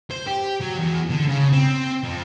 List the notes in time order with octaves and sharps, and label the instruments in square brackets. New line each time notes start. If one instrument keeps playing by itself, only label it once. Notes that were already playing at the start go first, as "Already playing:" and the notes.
[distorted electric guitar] C5
G4
F#3
E2
D3
C#3
C4
F2